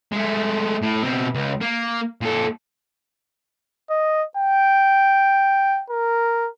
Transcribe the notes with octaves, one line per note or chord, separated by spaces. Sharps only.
G#3 A3
A2
B2 C4
C#2
A#3
A#2 A4
D#5
G5
A#4